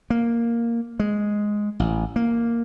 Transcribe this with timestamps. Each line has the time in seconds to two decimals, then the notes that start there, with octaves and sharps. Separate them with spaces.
0.10 A#3
1.00 G#3
1.80 A1
2.16 A#3